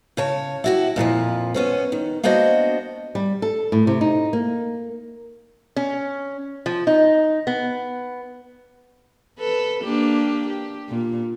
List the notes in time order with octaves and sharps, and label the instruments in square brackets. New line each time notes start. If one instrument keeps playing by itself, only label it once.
[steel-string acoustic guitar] C#3 C#5 A5
E4 F#4 G4
F2 A#2 D3 F3
B3 C#4 C5
D#3
A#3 B3 D4 F#4 C5 D#5
[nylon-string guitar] G3
A4
A2
C3
D#4
A#3
[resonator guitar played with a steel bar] C#4
F3
D#4
B3
[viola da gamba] A4 B4
A#3 D4 G4
G4
A#2